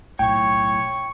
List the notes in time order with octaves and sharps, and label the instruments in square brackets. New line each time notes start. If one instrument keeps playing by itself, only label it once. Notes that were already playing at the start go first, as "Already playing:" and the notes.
[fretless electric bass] B1 A2 [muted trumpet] C#5 [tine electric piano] G5 [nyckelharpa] C#6